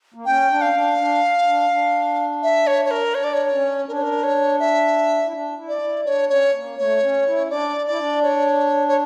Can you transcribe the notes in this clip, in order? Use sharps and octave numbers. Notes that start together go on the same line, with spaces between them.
A#3
C#4 G5
D4
F5
D4
D4
D4
D4
E5
C#5
C#5
A#4
D4 C#5
D5
C#5
C#4
D4 A#4
C#5
A#4
C#5
E5
E4
D4
E4
D5
E4
D4 C#5
C#4 C#5
A#3
A3 C#5
C#4
E4
D4 D5
E4 D5
D4
C#5
C#5